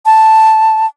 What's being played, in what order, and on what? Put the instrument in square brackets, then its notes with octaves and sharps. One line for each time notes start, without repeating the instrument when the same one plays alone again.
[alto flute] A5